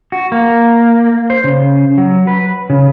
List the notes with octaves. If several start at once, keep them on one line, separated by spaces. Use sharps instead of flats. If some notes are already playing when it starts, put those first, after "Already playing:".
F#4
A#3
C5
C#3
F#3
B4
C#3